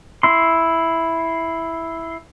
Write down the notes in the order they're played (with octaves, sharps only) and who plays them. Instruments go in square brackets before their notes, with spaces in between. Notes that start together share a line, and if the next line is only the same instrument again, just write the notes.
[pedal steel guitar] E4 C6